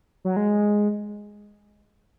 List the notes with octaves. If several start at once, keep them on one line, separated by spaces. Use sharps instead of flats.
F#3
G#3